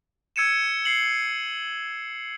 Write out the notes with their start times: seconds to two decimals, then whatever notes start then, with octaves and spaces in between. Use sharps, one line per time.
0.36 E6 G#6 C#7 D#7 E7
0.85 C7 C#7 F#7